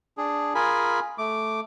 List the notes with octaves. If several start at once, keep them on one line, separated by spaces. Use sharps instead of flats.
D4 G#4
F4 G#4 A#4 G#5 B5
A3 D6